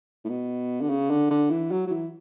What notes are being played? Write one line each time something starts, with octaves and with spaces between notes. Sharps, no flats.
A2
B2
D3
C#3
D3
D3
E3
F#3
F#3
E3